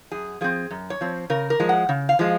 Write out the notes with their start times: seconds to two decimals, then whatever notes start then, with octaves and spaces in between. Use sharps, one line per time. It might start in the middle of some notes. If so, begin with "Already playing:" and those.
0.12 F#2 G#4
0.41 F3 C4 G#4
0.71 F#2
0.90 C#5
1.01 F3 C4
1.30 C#3 A#4
1.50 A#4
1.60 F3 G#3
1.69 F#5
1.89 C#3
2.09 F5
2.19 F3 G#3